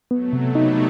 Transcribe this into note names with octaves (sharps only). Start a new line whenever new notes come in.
F#3 A3 B3
C3
G3 B3
D#4